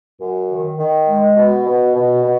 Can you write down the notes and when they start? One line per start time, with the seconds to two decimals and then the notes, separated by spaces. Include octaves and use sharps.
0.20 F#2
0.50 D#3
0.78 D#3
1.07 G#3
1.36 B2
1.66 B2
1.94 B2
2.23 B2